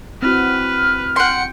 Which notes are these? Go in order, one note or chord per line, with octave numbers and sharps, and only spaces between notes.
C4 E4 F#4 B4 F6
F#5 G5 C6 C#7